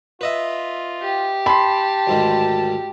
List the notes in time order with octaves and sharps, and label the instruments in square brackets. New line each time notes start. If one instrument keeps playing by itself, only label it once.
[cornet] F4 [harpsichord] B4 D#5 E5
[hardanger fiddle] G4
[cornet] A5 [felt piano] B5 C6
[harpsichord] D2 G#2 D#3